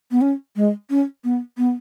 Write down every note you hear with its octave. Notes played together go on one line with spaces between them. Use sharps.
B3
C#4
G#3
C#4
B3
B3